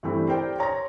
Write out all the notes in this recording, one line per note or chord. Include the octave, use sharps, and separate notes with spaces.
G2 E3 G3 A3 C4 E4
G4 A#4 C5 D5 G5
C#5 A#5 C6 A#6